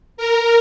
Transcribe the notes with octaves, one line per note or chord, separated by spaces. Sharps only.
A#4